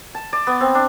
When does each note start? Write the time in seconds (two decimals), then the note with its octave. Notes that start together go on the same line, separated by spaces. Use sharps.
0.15 A5
0.33 D5
0.47 B3
0.61 C4
0.75 D4